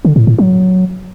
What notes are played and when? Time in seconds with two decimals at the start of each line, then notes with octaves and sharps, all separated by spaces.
0.05 D3
0.16 A2
0.27 A2
0.38 F#3